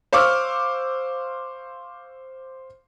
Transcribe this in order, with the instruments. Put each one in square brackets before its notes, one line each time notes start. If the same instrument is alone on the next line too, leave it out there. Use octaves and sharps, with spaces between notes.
[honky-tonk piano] C5 F5 C#6 D6 E6 F6